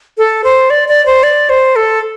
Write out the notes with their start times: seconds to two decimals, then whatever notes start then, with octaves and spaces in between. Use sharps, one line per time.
0.18 A4
0.44 C5
0.70 D5
0.88 D5
1.06 C5
1.23 D5
1.49 C5
1.76 A4